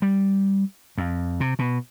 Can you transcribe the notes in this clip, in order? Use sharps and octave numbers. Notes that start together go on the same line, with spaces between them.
G3
F2
C3
B2